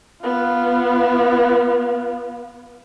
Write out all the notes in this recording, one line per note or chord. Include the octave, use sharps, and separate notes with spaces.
B3 F4